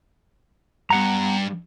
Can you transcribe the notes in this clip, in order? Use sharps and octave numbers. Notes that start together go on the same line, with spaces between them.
G2 B3 F#5 A#5